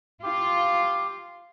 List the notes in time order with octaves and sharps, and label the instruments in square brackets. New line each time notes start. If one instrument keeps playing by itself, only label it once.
[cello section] F4 [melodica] G4